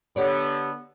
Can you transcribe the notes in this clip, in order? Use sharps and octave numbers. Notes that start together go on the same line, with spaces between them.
D3 B3 G4 C#5 D5